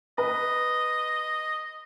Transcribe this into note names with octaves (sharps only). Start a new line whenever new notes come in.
B4 D#5